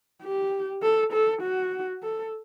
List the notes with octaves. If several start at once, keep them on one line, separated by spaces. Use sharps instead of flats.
G4
A4
A4
F#4
A4